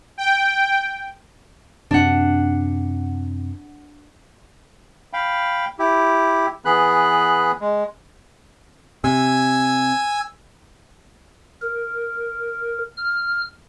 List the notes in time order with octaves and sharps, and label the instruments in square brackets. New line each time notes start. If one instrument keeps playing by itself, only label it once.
[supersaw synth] G5
[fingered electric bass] F#2 C3 [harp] D4 F#5
[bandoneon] F5 G5 B5
E4 G4
E3 B3 G#4 B5 F#6
G#3
[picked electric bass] C3 [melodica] G#5 E6
[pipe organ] A#4
F6